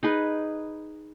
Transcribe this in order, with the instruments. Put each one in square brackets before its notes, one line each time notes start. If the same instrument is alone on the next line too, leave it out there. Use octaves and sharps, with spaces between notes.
[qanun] D#4 G#4 B4